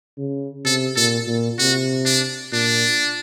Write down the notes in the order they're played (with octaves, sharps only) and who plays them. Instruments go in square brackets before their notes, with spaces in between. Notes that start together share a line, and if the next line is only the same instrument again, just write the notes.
[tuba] C#3
[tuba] C3 [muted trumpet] A4
[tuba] A#2 [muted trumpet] A4
[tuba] A#2
[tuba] C3 [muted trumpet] F#4
[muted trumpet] D4
[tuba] A#2 [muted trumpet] D4